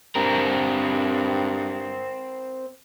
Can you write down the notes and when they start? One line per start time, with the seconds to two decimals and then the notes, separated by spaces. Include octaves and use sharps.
0.16 G2 C4 A#4